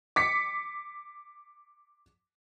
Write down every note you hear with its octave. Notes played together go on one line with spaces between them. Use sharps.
D6 B6 C#7